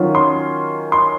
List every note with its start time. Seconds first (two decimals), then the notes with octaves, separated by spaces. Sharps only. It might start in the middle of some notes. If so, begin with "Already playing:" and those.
Already playing: D#3 F#3 C#4 F4
0.15 C6
0.92 C6